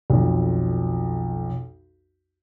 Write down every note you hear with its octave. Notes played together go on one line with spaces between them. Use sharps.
B1 F2